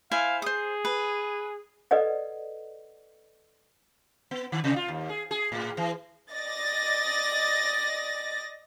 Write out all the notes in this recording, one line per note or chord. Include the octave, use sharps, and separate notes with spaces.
E4 C5 F5 G#5
G#4 C5 D#6
B4
A4 B4 D5 D#5 F#5
B3
D#3
C3
F4
D#2
G#4
G#4
A2
E3
D5 D#5 A6 A#6